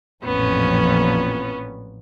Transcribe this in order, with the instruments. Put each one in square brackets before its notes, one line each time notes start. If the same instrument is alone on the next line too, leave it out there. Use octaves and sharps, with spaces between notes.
[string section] A1 F2 A#2 [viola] B3 C#4